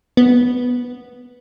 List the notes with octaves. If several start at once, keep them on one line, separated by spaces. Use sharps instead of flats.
B3